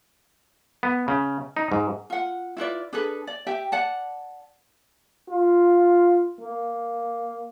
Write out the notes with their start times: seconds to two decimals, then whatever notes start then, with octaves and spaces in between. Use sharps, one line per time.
0.83 B3
1.08 C#3
1.57 D#4
1.72 G#2
2.10 F4 F#5
2.57 E4 F4 B4 D5
2.93 D4 G#4 A4 B4
3.27 D5
3.47 G4 E5 G5
3.72 D5 F#5 A5
5.29 F4
6.41 A#3